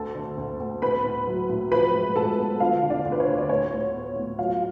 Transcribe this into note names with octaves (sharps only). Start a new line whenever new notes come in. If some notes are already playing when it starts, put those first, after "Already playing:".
Already playing: D2 A4 A5
D3
D2
D2
A2 B4 B5
A2
F#3
A2
F3 B4 B5
G#2
G#2 A4 A5
B3
D3 F4 F5
D3
D4 D5
D2
B4
C#5
D3
D5
A2 C#5
A2
B3
A2
F#3 F4 F5